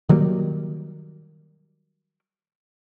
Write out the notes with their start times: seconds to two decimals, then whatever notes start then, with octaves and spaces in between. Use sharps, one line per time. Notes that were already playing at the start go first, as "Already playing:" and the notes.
0.09 D#3 F#3 G3 A#3